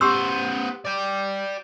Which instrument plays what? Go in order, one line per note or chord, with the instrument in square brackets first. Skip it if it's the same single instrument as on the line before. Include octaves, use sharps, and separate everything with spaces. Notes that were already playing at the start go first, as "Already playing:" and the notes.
[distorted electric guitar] B3 C5 [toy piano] G4 C6 E6
[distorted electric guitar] D5 G5